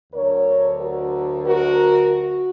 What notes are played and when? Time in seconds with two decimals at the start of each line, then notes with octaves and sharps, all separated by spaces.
0.12 D2 D3 F#3 A#4 C#5
0.78 F#4 A#4
1.44 F#4 A#4
2.11 F#4